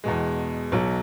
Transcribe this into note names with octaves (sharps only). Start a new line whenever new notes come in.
E2 B2 G#3
B1 B2 F#3